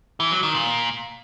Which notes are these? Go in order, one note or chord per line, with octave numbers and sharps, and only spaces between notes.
E3
F#3
D#3
A#2